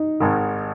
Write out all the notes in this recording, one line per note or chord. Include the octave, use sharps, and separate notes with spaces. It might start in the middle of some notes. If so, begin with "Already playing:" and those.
Already playing: D#4
G#1 G#2 D#3